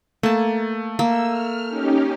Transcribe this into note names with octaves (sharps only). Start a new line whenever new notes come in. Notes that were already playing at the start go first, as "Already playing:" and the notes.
A3 A#3 A5
A#3 E6
F6
C#4 D#4 G4